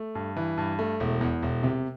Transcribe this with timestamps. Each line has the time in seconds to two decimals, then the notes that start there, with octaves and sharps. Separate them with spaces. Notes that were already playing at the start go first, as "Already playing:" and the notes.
Already playing: A3
0.15 G2
0.36 E3
0.57 G2
0.79 A3
1.00 E1
1.21 E2
1.42 E1
1.63 C3